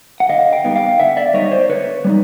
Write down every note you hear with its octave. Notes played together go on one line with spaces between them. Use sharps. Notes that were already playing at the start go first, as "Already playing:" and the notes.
F#5
D3 D#5 F5
F5 G5
G3 B3 D#4
F5 G5
D3 E5 F#5
D5 E5
G3 B3 D#4 C#5 D#5
C5 D5
D3 B4 C#5
G3 B3 D#4